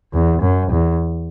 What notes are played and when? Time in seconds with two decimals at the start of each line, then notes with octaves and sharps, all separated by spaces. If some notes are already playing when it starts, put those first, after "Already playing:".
0.13 E2
0.42 F#2
0.72 E2